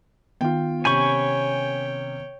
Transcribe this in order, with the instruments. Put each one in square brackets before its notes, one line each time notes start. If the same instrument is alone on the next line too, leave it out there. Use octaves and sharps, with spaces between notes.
[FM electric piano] D#3 B3 [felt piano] F4 G5
[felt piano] C3 C#4 G6 [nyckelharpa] C#5 G5 [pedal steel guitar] G#5 B5 C#6